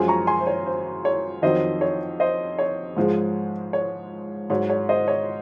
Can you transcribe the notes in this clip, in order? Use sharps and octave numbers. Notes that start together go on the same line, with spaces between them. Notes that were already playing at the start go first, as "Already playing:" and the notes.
Already playing: F#2 F3 G#3 G#5 C6
A#5 C#6
G#5 C6
C5
C#5
C5
C#5
F2 D#3 F#3 C5 D#5
C#5
C5 D#5
C#5
G#2 F3 G#3
C#5
G#2 F#3 C#5
C#5
C5 D#5
C#5